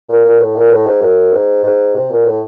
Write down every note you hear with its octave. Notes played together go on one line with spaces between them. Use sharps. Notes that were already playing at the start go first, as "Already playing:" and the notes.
A#2
A#2
A2
A#2
A2
G#2
F#2
G#2
G#2
C3
A#2
A2